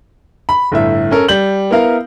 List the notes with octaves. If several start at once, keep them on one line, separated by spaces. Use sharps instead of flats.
B5
G1 A2 E5
C#4 A4 A#4
G3 G6 F#7
B3 E4 A#4 F5